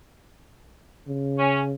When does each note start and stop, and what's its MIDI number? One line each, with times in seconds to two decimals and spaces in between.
1.07 1.75 49
1.38 1.61 61